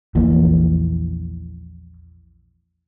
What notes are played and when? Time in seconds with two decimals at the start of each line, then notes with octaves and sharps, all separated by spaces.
0.15 A#1 E2 A#2